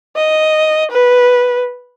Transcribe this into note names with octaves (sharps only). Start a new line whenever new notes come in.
D#5
B4